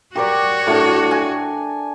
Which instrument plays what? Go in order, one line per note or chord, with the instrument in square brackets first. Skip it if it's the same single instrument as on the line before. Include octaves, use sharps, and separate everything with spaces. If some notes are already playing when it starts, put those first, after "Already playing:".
[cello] F#4 C#5 [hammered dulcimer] G4 A#4 D5
[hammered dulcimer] A2 D4
G#5